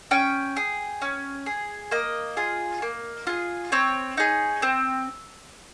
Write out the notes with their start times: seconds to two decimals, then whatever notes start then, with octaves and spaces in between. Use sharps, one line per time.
0.11 C#4 G5
0.57 G#4
1.02 C#4
1.46 G#4
1.91 A#3 D#5
2.37 F4 G#4
2.82 A#3
3.27 F4 G#4
3.72 C4 C#5
4.17 D#4 G#4
4.62 C4